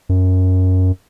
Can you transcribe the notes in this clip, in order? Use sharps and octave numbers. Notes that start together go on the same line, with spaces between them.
F#2